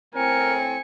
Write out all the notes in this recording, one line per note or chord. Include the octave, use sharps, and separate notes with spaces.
A2 C4 A#4 G#5 C#7